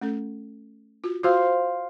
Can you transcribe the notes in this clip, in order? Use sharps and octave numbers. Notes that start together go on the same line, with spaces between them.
A3 C#4 A4
F4 F#4
F4 F#4 C5 F5